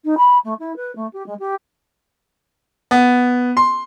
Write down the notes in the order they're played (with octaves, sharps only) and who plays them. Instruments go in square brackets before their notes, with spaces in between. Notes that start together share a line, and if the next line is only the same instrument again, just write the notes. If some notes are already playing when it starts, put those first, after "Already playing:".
[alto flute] D#4
B5
A3
E4
B4
A3
G4
G#3
G4
[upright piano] B3
C6